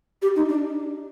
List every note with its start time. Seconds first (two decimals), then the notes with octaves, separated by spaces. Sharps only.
0.22 G4
0.36 D#4
0.49 D4